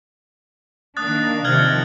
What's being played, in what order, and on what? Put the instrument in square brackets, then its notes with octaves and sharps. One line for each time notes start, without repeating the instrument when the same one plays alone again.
[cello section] D#3 A#3 D4 [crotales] D#6 F#6 A6
[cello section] C3 D#3 F3 [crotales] F6 G#6 F#7